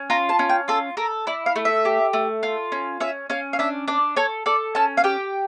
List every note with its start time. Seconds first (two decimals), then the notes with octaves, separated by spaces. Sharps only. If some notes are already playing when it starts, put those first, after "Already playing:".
Already playing: C#4
0.10 F4 A#5
0.29 A5
0.39 C#4
0.49 G5
0.68 F4 A4
0.97 A4 A#4
1.27 E4 D5
1.46 F5
1.56 A3
1.65 E5
1.85 G4
2.13 A3
2.43 F4
2.72 C#4
3.00 C#4 E5
3.30 C#4 F5
3.53 F5
3.59 D4 E5
3.88 D4 D5
4.16 A4 C#5
4.46 A4 D5
4.75 C#4 A5
4.97 F5
5.04 G4 G5